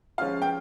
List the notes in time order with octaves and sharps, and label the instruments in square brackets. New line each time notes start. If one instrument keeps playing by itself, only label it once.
[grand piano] F3 G#3 C#4 F4 [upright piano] F5
[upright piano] G5